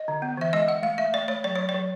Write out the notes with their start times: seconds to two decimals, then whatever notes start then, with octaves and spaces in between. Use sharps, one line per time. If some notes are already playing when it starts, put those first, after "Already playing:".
Already playing: D#5
0.08 D3
0.22 B3
0.37 E3 E5
0.53 G#3 D#5
0.68 G#3 F#5
0.83 A3 F5
0.98 A3 E5
1.14 A3 D5
1.28 A3 C#5
1.44 F#3 D5
1.55 F#3 C#5
1.69 D5
1.74 F#3